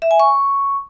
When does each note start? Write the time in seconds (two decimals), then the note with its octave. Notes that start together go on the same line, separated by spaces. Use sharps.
0.02 E5
0.11 G#5
0.20 C#6